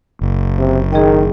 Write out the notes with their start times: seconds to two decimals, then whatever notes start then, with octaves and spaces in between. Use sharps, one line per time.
0.21 F#1
0.58 C3
0.92 D#3 G#4 D#5 G5